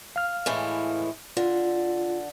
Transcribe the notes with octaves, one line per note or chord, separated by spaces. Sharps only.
F5 F6
A2 E3 G#3
D3 F4